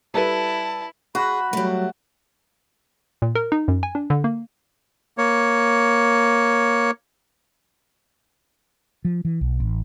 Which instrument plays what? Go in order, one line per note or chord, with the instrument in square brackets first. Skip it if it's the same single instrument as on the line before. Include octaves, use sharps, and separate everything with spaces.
[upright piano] G3 A4 B4 [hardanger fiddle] E4 [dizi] A5
[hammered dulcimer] F#4 [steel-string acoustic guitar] G#4 [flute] B5
[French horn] F#3 [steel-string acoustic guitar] G3 A3
[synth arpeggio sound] A#2
A#4
D#4
F#2
G#5
D4
D3
A#3
[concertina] A#3 C#5
[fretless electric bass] F3
E3
B1
A1